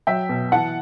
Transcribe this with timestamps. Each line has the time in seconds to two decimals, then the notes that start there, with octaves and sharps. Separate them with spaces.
0.07 F#3 E5 G5
0.29 B2
0.52 E3 F#5 A5